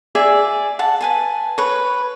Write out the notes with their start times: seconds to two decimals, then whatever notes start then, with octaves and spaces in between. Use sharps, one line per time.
0.15 G#4 D5 E5 G#5
0.79 F#5 A5
1.01 B4 G#5 A5
1.58 B4 C#5